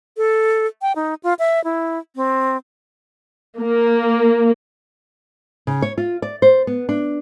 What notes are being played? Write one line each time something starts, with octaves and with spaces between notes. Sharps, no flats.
A4
G5
D#4
F4
E5
E4
C4
A#3
C#3
C#5
F4
D5
C5
B3
D4